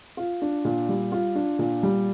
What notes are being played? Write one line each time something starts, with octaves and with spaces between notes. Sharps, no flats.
F4
D4
A#2
G3
F4
D4
A#2
G3